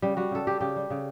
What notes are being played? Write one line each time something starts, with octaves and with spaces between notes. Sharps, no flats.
C#3 G3
G3 F#4
C#3 A4
G3 G4
C#3 G4
G3
C#3